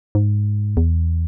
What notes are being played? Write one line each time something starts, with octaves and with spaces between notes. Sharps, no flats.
G#2
E2